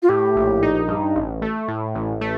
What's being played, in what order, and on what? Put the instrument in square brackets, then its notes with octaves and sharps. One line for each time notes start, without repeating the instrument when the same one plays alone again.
[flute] F4
[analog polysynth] A2 [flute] G4
[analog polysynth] A#1
D#4
G2
A1
A3
A2
A1
A3